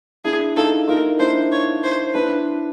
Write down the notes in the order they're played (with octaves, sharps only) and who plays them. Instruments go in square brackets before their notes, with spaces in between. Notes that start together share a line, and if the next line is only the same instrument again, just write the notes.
[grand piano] D4 E4 [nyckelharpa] G#4
[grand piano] D#4 F4 [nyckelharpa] A4
[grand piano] D#4 F4 [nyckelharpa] A#4
[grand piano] D4 E4 [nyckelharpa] C5
[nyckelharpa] C#5
C5
[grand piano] D4 E4 [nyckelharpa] B4